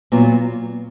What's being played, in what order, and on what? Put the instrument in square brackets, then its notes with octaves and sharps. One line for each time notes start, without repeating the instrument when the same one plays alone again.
[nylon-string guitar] A#2 F#3 B3 F4